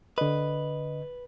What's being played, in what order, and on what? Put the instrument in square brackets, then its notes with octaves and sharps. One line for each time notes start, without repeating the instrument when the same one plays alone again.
[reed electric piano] D3 D#5 [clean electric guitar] B4